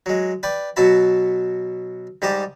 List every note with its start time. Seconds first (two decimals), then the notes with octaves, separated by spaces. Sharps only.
0.06 F#3 G#3
0.43 B4 D5 G5
0.76 B2 F#3 F#4 E5 A5 B5
2.22 G#2 G3 G4 D#5 A5 D6